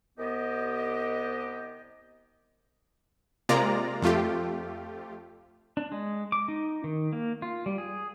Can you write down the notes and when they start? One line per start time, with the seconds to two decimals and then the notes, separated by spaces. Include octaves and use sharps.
0.18 C2 B3 G4 D#5
3.49 C3 G#3 A#3 F4 D5 A#5
4.02 F2 A3 F4 G4
5.77 D4
5.92 G#3
6.32 D6
6.48 D#4
6.84 D#3
7.13 A#3
7.42 F4
7.66 G3
7.78 G#4